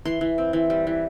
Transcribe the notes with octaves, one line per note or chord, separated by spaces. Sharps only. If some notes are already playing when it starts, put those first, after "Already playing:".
E3 C6
E3
C4
E3
G3
E3